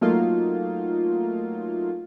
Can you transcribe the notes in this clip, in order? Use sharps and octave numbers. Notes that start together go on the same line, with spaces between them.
F#3 A3 A#3 D#4 F4